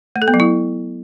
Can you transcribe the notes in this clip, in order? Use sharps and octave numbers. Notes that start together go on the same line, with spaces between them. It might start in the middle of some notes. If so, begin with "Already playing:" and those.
A3
A4
B3
F#3
E4